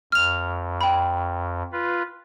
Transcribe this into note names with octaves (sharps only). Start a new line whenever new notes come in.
F2 F6 F7
G5 B5
F4 B4